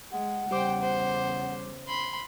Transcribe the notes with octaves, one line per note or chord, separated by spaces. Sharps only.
G#3 F#5
E2 C#3 G3 C5 G5 D6
C5
B5 C6